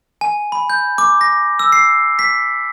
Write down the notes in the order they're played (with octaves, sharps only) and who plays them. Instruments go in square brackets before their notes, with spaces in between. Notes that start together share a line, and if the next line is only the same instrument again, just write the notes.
[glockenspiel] G#5
B5
G6
D6
A#6
E6
C7
B6